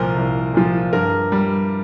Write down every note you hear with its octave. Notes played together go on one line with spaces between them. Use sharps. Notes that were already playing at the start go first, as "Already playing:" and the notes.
Already playing: C2 A#2 F3 A#4 C5
C2
A#2 F3
G2 A#4
G3